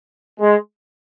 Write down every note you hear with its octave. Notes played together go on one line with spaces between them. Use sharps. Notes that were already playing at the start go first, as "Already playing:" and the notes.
G#3